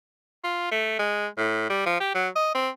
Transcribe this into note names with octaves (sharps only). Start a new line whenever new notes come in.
F4
A3
G#3
A2
G3
F3
G4
F#3
D#5
C4